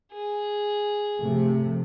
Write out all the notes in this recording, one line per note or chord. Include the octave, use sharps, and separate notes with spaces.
G#4
C3 F3 A3